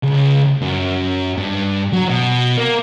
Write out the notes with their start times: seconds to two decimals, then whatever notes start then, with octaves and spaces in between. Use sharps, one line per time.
0.04 C#2
0.61 F#2
1.38 G2
1.93 F#3
2.09 B2
2.57 A#3